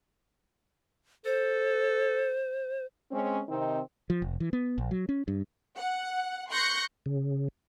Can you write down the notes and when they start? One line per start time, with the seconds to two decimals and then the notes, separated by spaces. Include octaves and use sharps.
1.25 A4 C5
3.12 G#3 C4 C#4
3.49 C3 D#3 C4 D#4
4.10 F3
4.22 F1
4.40 E3
4.53 B3
4.78 A#1
4.91 F#3
5.09 C#4
5.28 G2
5.77 F#5
6.51 C6 C#6 F#6 G6 A#6 C#7
7.06 C#3